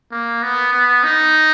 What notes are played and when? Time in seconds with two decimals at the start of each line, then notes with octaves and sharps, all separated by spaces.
0.12 A#3
0.43 B3
0.73 B3
1.04 D#4